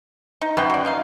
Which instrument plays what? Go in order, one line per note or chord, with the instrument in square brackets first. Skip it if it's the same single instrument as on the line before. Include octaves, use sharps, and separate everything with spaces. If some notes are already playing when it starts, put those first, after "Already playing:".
[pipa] D#4
[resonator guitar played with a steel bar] F#2 [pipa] B4 F#5 G5
[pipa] F#4 D5
A#3 D#4 F5